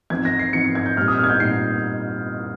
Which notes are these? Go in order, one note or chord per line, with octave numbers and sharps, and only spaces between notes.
F3 C4 D#4 G#6
A#6
C7
F3 C4 D#4 C#7
C7
G#6
G6
A#2 G3 C4 D#4 F6
D#6
F6
G#6
G6
A#2 G3 C4 D#4 C7